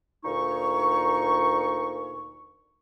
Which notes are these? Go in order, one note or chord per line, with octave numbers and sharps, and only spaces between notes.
D2 A#2 D#4 C#6